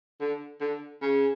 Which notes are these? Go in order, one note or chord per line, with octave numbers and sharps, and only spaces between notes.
D3
D3
C#3